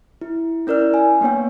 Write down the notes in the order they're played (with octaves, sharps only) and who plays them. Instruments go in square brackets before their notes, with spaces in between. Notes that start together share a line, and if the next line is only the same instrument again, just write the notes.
[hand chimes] E4
C#4 E4 A#4 D5 F6
G#5
A#3 B3 D4 C#5 G5